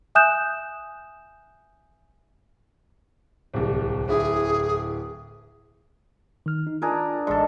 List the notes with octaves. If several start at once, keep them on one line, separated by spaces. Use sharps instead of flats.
E5 G#5 D#6 F#6 G6 E7
D1 C2
D1 E4 G#4
D#3 F6
D#4
D4 F4 G#4 A#4 G#5
A1 G#2 A4 D5